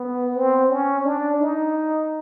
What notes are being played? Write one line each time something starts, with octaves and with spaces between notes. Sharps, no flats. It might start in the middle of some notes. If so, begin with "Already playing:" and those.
Already playing: B3
C4
C#4
D4
D#4